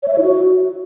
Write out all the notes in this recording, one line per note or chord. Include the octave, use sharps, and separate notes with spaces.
C#5
E5
C#5
E4
F#4